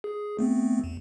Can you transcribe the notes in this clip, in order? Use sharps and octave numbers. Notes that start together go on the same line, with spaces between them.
G#4
A3 B3 C4
E2